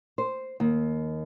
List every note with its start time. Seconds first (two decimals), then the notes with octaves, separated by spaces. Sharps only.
0.18 C5
0.60 D#2